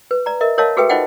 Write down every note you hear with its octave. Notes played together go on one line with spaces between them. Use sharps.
B4
D5 A#5
A#4 D#5 E5
A#4 C#5 D#5 F5 A5
F#4 G#4 A4 B4 E5 G5
D#4 F4 C5 D#5 F#5 G5